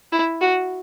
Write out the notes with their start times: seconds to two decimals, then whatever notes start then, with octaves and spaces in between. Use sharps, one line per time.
0.12 E4
0.41 F#4